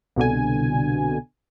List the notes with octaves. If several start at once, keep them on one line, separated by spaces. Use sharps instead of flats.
C2 B2 D3 G#5